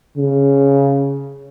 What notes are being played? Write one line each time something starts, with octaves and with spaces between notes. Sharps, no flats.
C#3